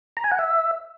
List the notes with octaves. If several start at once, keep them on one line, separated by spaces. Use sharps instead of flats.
A#5
G#5
F#5
E5